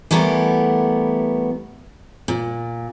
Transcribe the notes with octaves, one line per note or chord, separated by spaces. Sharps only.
E3 G3 A3 B3 A#4
A#2